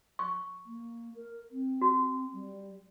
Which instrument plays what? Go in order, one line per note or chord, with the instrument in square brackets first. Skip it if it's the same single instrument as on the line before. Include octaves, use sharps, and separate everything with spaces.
[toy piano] C#6
[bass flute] A#3
A#4
C4
[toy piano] F#4
[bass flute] G3